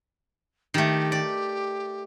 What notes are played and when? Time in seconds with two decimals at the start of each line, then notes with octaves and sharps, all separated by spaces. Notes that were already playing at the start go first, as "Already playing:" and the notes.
0.74 D#3 A3 G4
1.12 D5